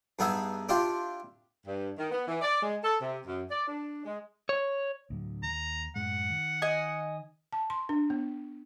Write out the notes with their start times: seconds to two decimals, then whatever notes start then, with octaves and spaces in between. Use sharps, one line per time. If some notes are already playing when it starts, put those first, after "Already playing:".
0.19 G2 B3 D#4 G#4 E5
0.69 D4 E4 F4 G4
1.66 G2
1.98 D#3
2.11 B3
2.28 E3
2.41 D5
2.62 G#3
2.83 A4
3.01 C3
3.26 F#2
3.50 D5
3.68 D4
4.05 G#3
4.49 C#5
5.10 D2 A2 F#3
5.43 D#2 A#5
5.96 F#2 A2 G#3 F#5
6.30 D#3
6.62 D#5 G#5
7.53 A5
7.70 C6
7.89 D4
8.10 B3